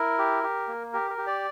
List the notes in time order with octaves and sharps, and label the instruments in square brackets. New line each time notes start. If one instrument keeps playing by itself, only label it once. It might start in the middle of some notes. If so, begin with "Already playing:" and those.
Already playing: [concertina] E4 A#4
G4
G4
A#3
G4 A#4
A#4
G4
D5